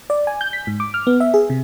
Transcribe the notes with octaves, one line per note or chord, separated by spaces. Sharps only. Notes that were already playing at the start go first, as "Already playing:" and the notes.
D5
G#5
G6
B6
G#2
D6
F6
B3
E5
G#4
C3